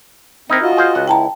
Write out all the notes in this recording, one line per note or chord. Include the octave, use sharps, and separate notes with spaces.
C4 D#4 E4 A#4
F4 F#4 D#5
G#4 C5 F5
C#2 F#5
E4 G5 A5 A#5